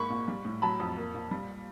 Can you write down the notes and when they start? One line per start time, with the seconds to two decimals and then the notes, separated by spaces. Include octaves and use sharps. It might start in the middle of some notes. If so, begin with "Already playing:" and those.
Already playing: G#2 A#3 B5 C#6
0.10 A#2
0.28 G3
0.45 A2
0.62 F#3 A5 B5
0.80 F2
0.97 A#3
1.14 A#2
1.31 G3